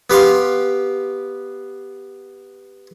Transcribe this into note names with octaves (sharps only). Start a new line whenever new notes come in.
B3 G4 F5 C6